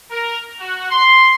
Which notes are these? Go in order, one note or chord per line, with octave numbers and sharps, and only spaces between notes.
A#4
F#4
C6